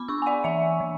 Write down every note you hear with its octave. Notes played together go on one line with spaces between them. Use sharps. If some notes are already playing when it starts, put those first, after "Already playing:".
Already playing: B3 B5 D6
D4 C#6 E6
G#5
D5 F#5
E3 E5 G#5
E3